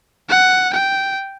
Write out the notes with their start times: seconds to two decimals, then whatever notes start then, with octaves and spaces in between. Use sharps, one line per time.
0.29 F#5
0.74 G5